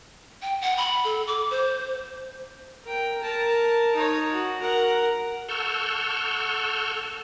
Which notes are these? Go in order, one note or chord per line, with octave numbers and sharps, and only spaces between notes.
G5
F#5
B5
A4
D6
C5
A#4 G5
A#4 A5
D#4 C#5
F#4
A#4 F#5
A4 F#5 C#6 E6 F6 G6